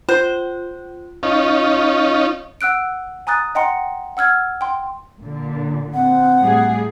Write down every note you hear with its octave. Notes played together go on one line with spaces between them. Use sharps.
F4 C5
C#4 D#4 F4
F#5 E6 F#6 D7
G#5 A#5 D#6 F#6 A6
D#5 F#5 G5 A#5 C6 C#7
F#5 E6 F6 G#6
G5 C6
A#2 D3
C4 F#5
A2 G3 G#4